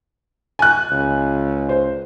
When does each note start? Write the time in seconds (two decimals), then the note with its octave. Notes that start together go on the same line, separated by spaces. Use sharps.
0.59 G#5 F#6
0.91 C#2
1.69 C5